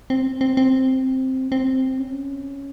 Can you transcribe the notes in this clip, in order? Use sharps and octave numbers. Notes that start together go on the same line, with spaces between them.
C4
C4
C4
C4
C#4